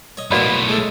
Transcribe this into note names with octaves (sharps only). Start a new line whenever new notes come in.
C#5 D#5
B1 A2 A#3 B3 F#4 A#4 D5 B5
G#3 A3